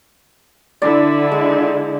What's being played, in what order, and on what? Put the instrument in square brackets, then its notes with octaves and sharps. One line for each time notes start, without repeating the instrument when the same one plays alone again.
[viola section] D3 E4 [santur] D5
[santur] G#3